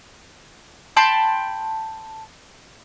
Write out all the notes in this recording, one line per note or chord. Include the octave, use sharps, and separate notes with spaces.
G5 A5 B5 C6